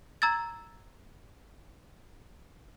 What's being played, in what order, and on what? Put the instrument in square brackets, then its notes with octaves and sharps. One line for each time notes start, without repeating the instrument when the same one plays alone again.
[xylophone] A#5 E6 G#6 A6